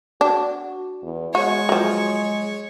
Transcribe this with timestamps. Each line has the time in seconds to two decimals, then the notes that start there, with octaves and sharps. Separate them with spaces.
0.21 D4 F#4
1.03 E2
1.35 G#3 F#4 C#5
1.69 F3 F#3